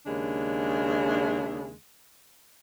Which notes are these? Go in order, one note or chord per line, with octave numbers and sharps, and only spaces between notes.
D#2 C#3 G#3 D4